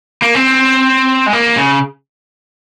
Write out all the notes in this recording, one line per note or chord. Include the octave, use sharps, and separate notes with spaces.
A#3
C4
G#3
A#3
C#3